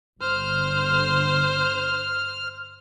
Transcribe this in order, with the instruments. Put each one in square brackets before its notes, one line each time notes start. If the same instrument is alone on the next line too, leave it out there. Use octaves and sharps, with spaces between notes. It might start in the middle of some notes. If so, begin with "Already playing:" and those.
[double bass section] G1 D3 [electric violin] C5 [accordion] F6